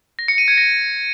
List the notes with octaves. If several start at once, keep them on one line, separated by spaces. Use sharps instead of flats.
A#6
C#7
D#7
G#6
A#6